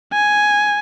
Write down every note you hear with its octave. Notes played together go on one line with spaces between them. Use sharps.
G#5